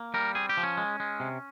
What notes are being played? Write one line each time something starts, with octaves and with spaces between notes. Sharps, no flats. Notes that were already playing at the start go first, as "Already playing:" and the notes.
Already playing: A#3
G3 A#4
C4 G#4
G4
F3
C#4
G#3
G#3
C3